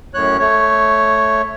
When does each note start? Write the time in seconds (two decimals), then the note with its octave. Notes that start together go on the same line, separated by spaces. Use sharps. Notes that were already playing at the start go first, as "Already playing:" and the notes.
0.14 F#2 A2 C#5 F#6
0.39 A3 C#5